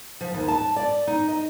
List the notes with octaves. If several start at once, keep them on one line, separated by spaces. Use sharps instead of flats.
F3
D#2
A5
D5
D#4
D#5